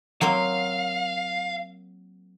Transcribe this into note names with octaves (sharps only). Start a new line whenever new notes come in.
F#3 A#3 C4 F5